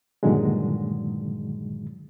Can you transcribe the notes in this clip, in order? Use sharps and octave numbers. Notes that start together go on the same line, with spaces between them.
G2 A#2 D3 D#3 F#3 G#3